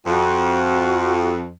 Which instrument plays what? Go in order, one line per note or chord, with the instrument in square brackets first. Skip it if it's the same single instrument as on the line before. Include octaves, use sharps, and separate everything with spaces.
[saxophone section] F2 [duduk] F#4